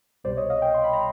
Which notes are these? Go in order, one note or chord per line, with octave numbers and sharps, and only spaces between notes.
C2 B2 G3 C5 D5
C#5 D#5
D#5 F5
F5 G5
C6
B5
A#5